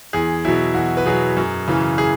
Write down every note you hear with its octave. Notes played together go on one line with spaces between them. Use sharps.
E2 G#4
B2 F#3 E4
E2 F#4
B4
B2 F#3 G#4
F#2
C#3 E3
G#4